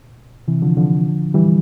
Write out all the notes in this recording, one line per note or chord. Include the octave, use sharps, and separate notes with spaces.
C3 E3
D3 F3
D3 F3
E3 G3